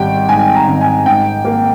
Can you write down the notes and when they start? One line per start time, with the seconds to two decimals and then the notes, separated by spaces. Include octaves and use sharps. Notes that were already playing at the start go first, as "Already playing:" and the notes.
Already playing: G#1 G3 G5
0.29 G#2 G#5
0.55 A#5
0.68 G#1
0.81 G#5
1.06 G#2 G5
1.45 A#3